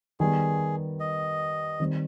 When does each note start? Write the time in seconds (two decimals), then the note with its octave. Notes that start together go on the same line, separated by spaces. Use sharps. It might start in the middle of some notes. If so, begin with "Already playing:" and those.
0.20 D#3 G3 B3 G#4
1.00 D#5
1.80 D#3 G3 C4